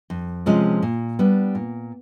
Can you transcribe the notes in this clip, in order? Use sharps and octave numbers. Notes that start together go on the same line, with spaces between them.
F2
C3 F3 G#3 C#4
A#2
G3 B3 D4
A#2